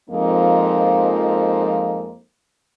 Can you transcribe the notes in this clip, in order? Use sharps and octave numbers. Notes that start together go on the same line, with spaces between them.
F2 F3 G#3 A#3 C4 D#4